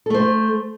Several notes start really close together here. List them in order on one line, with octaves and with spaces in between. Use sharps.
A4 A3 C5